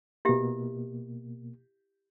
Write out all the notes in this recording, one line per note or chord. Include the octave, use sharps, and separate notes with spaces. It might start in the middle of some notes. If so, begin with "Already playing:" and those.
B2 A#3 E4 G4 E5